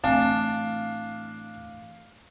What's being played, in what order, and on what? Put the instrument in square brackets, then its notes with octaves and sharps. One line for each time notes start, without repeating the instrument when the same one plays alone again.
[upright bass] A2 E3 [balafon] C4 [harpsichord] D4 [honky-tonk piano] F5